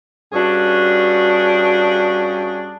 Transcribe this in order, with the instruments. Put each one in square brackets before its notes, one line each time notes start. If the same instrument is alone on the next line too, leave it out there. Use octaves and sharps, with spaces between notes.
[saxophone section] G2 C#4 D4 F#4 G#4